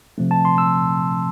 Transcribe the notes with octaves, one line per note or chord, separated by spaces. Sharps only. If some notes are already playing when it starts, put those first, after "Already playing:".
C3 F3 A3 C4
A5
C6
E6